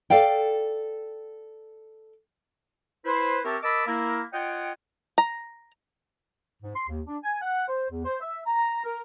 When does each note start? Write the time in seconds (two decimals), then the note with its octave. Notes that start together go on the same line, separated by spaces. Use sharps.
0.10 A4 D5 F5 G5
3.05 E4 B4 C5
3.44 C4 G4 A#4 C#5 E5 A5
3.62 A#4 D#5 A5 B5 D6 E6
3.87 A#3 E4 A#4
4.32 F4 C#5 D#5 F#5 G5
5.18 A#5
6.62 G#2
6.76 C6
6.88 D#2
7.07 D4
7.23 G#5
7.41 F#5
7.68 C5
7.89 E2
8.05 C5
8.21 E5
8.46 A#5
8.85 A#4